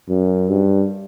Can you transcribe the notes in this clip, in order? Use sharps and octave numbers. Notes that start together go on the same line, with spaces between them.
F#2
G2